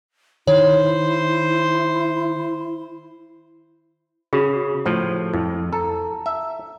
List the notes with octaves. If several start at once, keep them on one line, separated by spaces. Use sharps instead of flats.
D#3 E4 C5 C#5
C#3 F#4 G#4
A2 F3
F2 E4
A4 A#5
E5